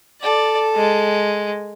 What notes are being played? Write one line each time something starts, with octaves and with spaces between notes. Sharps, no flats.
A4 D5
G#3